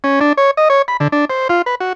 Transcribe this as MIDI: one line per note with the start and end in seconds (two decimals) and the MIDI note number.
0.04 0.20 61
0.21 0.33 62
0.37 0.51 73
0.57 0.68 75
0.70 0.82 73
0.88 0.97 83
1.00 1.08 50
1.12 1.25 62
1.30 1.48 72
1.49 1.62 65
1.66 1.75 71
1.80 1.93 66